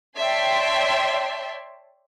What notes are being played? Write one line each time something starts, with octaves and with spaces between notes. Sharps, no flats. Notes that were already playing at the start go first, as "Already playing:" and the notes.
C#5 D5 E5 G5 A5 C6